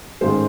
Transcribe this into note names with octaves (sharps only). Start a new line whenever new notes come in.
A1 G#2 D#3 G#3 C5